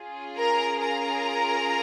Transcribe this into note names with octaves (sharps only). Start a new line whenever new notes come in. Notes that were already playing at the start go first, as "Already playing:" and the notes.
Already playing: C#4 F4 G#4
A#4 A#5
A#4 A#5